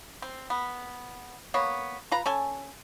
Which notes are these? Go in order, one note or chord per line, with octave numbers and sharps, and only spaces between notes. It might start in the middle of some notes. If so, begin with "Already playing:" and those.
C4
B3
A#3 B3 C#5
F4 B4 A#5
C#4 A4 G#5